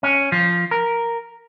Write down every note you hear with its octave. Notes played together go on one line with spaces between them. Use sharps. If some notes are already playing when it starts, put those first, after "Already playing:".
C#4
F3
A#4